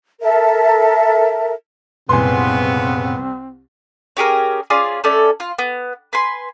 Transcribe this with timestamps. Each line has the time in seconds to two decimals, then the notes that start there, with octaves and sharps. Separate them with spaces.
0.21 A4 A#4 E5
2.09 C2 F#2 A#2 C#3 B3 C4 G#5 C6
4.17 C#4 G4 G#4 A#4
4.70 C#4 F4 G#4 D5
5.04 A3 C#4 A4 D5
5.40 F4
5.59 B3
6.13 B4 G#5 C6